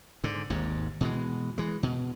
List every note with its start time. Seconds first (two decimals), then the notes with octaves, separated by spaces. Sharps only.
0.24 G#2 D3
0.50 G#1 D#2 G#2
1.01 B2 E3 G#3
1.58 E3 G#3
1.83 B2